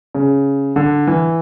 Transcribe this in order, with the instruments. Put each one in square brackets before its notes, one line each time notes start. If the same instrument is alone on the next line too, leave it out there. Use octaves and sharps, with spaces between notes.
[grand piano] C#3
D3
E3